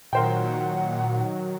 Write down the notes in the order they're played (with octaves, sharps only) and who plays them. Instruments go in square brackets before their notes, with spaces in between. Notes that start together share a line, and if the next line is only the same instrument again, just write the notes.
[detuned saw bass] A#2 [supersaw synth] D#3 F#3 [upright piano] A#4 C5 G5 [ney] F#5